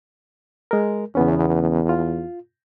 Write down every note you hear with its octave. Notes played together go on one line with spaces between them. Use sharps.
G#3 A#4
E2 C#3 B3 C#4
F4